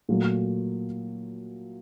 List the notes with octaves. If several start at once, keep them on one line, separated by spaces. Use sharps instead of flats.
A#2 F#3 A3